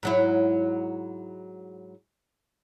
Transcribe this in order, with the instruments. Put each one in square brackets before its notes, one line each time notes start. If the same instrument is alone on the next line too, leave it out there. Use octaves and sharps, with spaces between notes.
[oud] G#2 F#3 E4